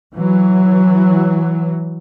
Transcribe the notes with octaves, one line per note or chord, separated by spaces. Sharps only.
E3 F#3